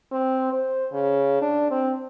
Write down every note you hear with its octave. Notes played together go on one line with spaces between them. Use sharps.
C4
C5
C#3
D4
C4